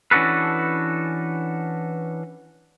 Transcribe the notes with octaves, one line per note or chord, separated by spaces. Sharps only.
E3 C#4 D4 F#4 A4 B4